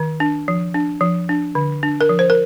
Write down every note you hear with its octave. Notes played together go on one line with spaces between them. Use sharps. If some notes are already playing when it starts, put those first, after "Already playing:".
Already playing: D#3
D4
F3
D4
F3
D4
D3
D4
A#4
F3
C5
A#4